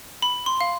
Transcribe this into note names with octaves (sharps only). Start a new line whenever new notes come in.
B5
C6
F5